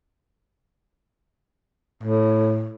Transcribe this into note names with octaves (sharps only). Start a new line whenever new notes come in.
A2